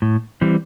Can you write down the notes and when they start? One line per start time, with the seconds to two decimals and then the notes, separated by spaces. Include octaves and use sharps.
0.02 A2
0.41 E3 G3 C4